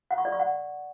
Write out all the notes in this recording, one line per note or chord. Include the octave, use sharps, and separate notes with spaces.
F#5
C#6
D5
C#6
F#5